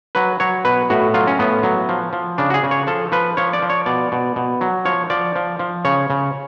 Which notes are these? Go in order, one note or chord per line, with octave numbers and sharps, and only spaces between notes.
F#3 B4
F#3 C#5
B2 B4
A2 F#4
F#3 F4
C#4
A2 B3
F#3
F3
F3
C#3 D4
F#4
G#4
C#3
C#5
F3 A4
F3 B4
F3 C#5
D5
F3
C#5
B2 D5
B2
B2
F#3
F3 C#5
F3 D5
F3
F3
C#3 C#5
C#3